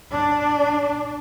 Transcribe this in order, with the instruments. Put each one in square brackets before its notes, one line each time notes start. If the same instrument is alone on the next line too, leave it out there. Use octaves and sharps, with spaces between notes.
[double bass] D4